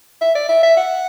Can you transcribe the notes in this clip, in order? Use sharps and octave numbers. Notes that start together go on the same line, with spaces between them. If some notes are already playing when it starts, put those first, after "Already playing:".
E5
D5
E5
E5
F#5